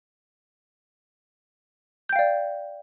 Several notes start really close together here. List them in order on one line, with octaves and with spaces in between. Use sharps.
G6 G5 F5 D5